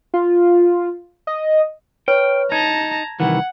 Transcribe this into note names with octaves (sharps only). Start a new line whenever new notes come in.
F4
D#5
B4 C#5 G5 F6
D#4 A5 A#5 G#6
C2 D#3 E3 F#5